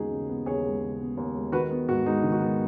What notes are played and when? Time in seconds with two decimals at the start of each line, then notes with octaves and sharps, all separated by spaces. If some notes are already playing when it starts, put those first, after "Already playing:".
Already playing: D#2 C#3 G#3 B3 D#4 F#4 G#4
0.11 C#3
0.29 B3
0.46 D#2 G#4 C#5
0.64 G#3
0.82 C#3
1.00 B3
1.17 D#2
1.35 G#3
1.52 D#3 F#4 B4
1.71 B3
1.88 G#2 F#4
2.06 G#3 D#4
2.23 D#3
2.32 F#4
2.41 B3